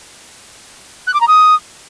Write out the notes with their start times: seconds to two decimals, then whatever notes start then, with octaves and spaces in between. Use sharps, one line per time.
1.07 F#6
1.14 D6
1.21 A#5
1.28 D#6